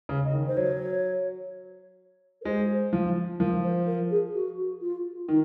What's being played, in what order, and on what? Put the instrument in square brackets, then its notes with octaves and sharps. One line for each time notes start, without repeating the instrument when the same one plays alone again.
[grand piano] C#3
[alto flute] D#5
[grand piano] D#3
[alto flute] C5
[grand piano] F#3 [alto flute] C#5
[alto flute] A#4
[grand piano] G#3 [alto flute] C5
[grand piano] F3
[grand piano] F3 [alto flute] A#4
[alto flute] C5
A#4
G#4
F#4
F4
[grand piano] D#3 [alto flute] D#4